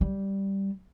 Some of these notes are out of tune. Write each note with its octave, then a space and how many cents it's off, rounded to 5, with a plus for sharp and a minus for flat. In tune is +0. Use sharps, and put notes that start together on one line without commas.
G3 -5